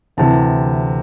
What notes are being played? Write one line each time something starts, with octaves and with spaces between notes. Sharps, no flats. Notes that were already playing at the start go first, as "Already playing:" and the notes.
D2 C3 E3 A5